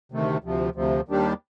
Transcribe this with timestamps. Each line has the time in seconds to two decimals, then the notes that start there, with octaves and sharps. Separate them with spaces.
0.12 D2 C3 D#3 A3
0.44 D2 C3 F3
0.75 D2 C3 F3
1.08 D#2 D#3 G3 D4 G4